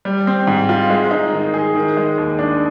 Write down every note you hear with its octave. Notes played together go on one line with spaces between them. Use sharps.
G3
C4
G#2
F4
G#3
D#4
D#3
G#4
D#3
G#3
D#2
D4